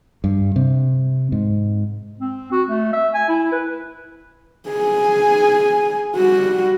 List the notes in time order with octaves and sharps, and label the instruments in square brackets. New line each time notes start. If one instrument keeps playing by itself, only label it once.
[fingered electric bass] G2
C3
G#2
[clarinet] C4
F#4
A3
E5
G#5
E4
B4
[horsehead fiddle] G#4 G#5
G3 F#4